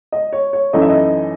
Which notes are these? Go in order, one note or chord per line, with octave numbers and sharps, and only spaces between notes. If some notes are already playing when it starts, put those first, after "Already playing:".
D#5
C#5
C#5
F#2 E3 A3 D#4 D#5
E5
D#5